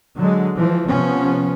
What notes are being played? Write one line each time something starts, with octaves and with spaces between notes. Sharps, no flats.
D3 F#3 G#3
E3 F3
C3 F3 B3 C#4